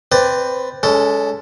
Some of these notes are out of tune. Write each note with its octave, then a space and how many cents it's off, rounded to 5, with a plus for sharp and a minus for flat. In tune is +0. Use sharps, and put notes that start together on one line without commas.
C4 +0 B4 +10 D5 +5
G#3 +0 C#4 +30 A4 +0